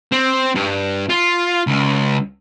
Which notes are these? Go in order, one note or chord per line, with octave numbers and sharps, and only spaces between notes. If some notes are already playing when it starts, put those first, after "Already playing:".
C4
G2
F4
C#2